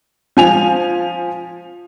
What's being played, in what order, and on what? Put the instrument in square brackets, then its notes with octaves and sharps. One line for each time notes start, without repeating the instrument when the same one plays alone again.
[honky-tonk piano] F3 G#5 F7